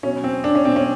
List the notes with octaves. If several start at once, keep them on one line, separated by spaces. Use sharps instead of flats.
B2 F#3 C#4
C4
D4
C#4
B2 F#3 C4
C#4